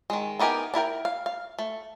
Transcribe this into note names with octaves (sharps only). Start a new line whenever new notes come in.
D#3 G#3
B3 D#4 G4 A#4 G#5
D4 E4 A#4 G5
F5
F5
A3